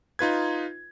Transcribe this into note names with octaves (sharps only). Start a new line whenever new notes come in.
D#4 F4 B4 G#6